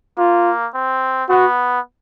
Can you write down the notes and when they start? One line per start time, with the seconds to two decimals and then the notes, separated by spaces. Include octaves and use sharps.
0.18 A#3 F4
0.75 C4
1.29 B3 F#4